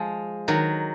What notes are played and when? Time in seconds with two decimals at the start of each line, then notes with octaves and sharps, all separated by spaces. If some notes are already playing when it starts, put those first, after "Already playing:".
Already playing: F3 G#3
0.48 D#3 F#3